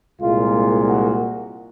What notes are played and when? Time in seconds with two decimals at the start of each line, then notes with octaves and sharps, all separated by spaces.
0.21 C2 A#2 G#3 F4
0.88 F#4